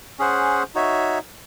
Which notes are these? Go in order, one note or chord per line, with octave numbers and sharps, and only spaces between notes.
C#4 G#4 C5 F#5
D#4 F#4 C#5 E5